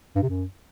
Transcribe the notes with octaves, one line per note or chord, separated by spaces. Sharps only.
G2
C3
F#2